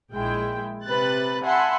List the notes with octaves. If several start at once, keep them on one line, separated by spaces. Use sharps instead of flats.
A#1 G#3 E4 G5
C3 B4 F#6 A6
E5 F#5 G#5 A5 B5 C6